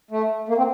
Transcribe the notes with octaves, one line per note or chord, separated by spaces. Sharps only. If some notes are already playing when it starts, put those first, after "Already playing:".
A3
A#3
C4